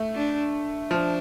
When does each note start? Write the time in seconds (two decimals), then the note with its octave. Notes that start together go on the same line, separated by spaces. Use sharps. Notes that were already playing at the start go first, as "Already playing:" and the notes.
Already playing: A3
0.15 D4
0.90 F3 D4